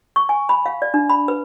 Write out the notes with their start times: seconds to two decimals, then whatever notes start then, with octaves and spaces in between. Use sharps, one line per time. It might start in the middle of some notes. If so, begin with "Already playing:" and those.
0.16 C#6
0.29 G#5
0.49 B5
0.66 F5
0.82 D5
0.94 D4
1.10 B5
1.28 B4